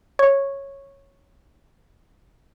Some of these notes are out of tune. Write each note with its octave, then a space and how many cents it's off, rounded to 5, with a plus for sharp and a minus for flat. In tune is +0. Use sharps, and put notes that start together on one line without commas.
C#5 -10